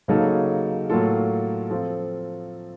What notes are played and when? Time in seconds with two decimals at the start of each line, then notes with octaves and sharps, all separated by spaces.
0.08 C#3 F#3 A#3 D#4 A4
0.90 A2 F#3 A#3 F4 A4
1.70 F3 C4 F4 A4